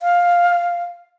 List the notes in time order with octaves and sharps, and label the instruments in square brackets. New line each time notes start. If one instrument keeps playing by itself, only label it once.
[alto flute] F5